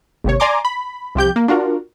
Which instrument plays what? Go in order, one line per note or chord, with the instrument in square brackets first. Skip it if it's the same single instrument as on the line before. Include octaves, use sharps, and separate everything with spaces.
[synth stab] G#1 D#2 C3 C#5
D5 G#5 A#5 C6 D6
B5
C2 F3 G4 G6
A#3
D4 F4 F#4 A#4